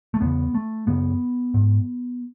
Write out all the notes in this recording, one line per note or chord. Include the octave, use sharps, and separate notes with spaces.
A3
E2 C#3 B3
A3
F#2 C#3 B3
G#2